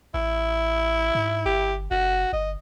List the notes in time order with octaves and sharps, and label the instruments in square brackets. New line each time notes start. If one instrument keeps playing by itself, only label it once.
[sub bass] A1 [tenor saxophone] E4
[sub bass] G#2
[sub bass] G1 [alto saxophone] G4
[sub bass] F#1 [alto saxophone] F#4
[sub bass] G1 [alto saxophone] D#5